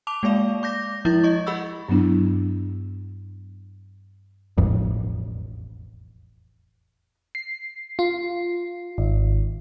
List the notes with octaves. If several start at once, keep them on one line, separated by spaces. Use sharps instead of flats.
A5 D6 F7
G#3 A#3 D5 F5
D6 G6 A#6
F3 G#3 E4 G6 A6
D#5 C#6
G#4 F#5 B5 C#6 E6
G2 F#3 B3 D4 E4
E1 A1 F2
C7
F4
G#1